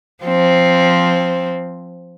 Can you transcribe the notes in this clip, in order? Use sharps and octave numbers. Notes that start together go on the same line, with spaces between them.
F3 C4